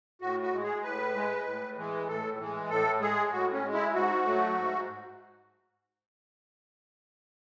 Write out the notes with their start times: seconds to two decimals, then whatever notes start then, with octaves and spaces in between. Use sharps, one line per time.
0.21 A2 F#4
0.42 F#4
0.53 G#3
0.63 G#4
0.83 A2 B4
1.15 G#3
1.46 A2
1.77 E3 G#3
2.08 A2 A4
2.39 E3 G#3
2.70 A2 A4
3.01 G#3 G#4
3.32 A2 F#4
3.52 C#4
3.63 G#3
3.73 E4
3.94 G#2 F#4
4.25 F#3 A3
4.56 G#2